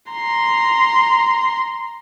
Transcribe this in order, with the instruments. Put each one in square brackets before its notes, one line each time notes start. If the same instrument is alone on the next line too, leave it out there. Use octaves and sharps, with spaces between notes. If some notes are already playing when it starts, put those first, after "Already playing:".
[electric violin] A#5 C6